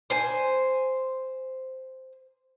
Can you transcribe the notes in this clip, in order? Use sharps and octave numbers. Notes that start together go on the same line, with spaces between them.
C5 G#5